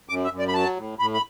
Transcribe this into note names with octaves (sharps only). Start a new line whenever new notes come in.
F#2 D6
E5
F#2
D5
B5
F#3 A5
A2
A2 B5
B5